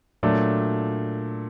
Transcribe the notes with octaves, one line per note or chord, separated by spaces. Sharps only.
A#2 F#3 A3 D4